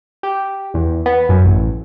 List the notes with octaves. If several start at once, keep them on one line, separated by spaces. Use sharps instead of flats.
G4
E2
B3
F#2
A1